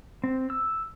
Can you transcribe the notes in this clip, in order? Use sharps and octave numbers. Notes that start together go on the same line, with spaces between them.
C4
E6